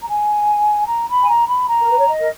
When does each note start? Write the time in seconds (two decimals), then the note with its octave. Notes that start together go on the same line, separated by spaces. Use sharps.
0.02 A#5
0.08 G#5
0.88 A#5
1.08 B5
1.22 G#5
1.27 A#5
1.48 B5
1.67 A#5
1.79 A#4
1.88 B4
1.97 C#5
2.07 D#5
2.20 A#4